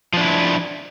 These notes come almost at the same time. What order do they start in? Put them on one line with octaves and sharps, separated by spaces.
F3 D4 E4